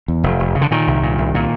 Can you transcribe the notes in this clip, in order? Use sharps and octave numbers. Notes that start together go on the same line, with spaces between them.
E2
F1
F1
C#3
D3
A#2 D#3
C2
A#2
C2
A#2